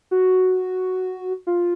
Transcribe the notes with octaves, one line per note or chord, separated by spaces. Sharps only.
F#4
F4